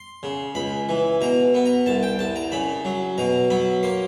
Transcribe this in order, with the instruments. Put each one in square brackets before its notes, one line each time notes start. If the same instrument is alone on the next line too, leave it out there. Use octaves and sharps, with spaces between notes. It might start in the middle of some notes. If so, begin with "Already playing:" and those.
Already playing: [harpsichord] C6
C#3
C#2 B5
E3
B2 A#5
B3
A#5
C2 A5
G5
C2 A5
A#5
C#3 B5
F#3
B2 A#5
F#3 B5
A#3 C6